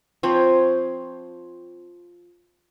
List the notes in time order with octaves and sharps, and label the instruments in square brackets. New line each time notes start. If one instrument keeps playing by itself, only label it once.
[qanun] F3 C4 C5 C#5